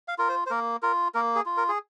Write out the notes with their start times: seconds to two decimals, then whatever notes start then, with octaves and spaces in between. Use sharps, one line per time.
0.08 F5
0.18 F4 A#4
0.29 C5
0.46 C5
0.50 A#3 A#4
0.82 F4 A#4
1.14 A#3 A#4
1.35 G#4
1.46 F4
1.57 A#4
1.68 G#4